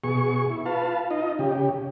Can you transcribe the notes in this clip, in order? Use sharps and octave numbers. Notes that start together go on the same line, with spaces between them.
B2 G#4 C#6
E4
F4 B4 F5 A5
D#4 F4 D#5
C#3 G4